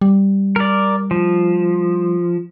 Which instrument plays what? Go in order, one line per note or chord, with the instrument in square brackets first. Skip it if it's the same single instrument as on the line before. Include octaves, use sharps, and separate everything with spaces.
[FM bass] G3
[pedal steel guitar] A#4 D5
F3